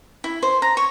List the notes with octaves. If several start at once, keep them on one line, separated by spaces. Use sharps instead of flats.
E4
C5
A#5
C#5